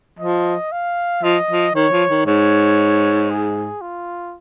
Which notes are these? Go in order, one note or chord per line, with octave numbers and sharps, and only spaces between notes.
F3 D#5
F5
F3 D#5
F3
D#3 C#5
F3
D#3
G#2 C#5
G#4
F4